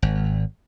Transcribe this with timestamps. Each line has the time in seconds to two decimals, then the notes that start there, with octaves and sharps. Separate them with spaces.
0.02 G#1